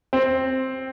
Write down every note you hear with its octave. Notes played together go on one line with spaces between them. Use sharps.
C4